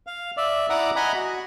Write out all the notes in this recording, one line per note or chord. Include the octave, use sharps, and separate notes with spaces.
F5
D5 E5
E4 D5 F#5 A#5 D6 D#6
D#5 F#5 G#5 A#5 B5
F#4